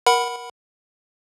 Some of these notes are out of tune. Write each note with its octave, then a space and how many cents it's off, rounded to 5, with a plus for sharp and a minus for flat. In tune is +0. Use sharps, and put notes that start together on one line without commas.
A#4 +20 F#5 +0 B5 +0